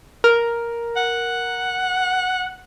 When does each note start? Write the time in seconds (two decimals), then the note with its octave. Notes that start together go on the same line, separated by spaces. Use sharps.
0.24 A#4
0.97 F#5